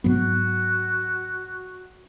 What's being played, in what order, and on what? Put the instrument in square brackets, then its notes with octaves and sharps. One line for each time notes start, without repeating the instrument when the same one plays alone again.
[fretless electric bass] G#2 F#3 B3 [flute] F#4